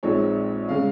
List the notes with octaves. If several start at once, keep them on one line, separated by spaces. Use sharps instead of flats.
A#1 A#2 G#3 C4 D#4 C#5
C#3 G#3 F5